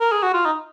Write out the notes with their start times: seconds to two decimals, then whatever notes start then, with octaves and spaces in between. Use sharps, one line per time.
0.01 A#4
0.12 G#4
0.23 F#4
0.34 F4
0.45 D#4